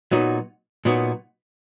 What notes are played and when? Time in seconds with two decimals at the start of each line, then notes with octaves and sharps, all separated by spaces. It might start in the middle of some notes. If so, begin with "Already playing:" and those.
0.11 A#2 F#3 B3 D#4 F#4
0.85 A#2 F#3 B3 D#4 F#4